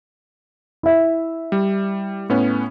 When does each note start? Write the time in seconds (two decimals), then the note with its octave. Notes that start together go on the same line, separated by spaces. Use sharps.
0.83 E4 E5
1.52 G3
2.29 A2 B3 C#4